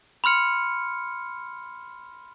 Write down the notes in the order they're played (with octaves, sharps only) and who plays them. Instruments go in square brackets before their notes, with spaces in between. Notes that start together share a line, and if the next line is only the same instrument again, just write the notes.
[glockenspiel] B5 C6 F6 C#7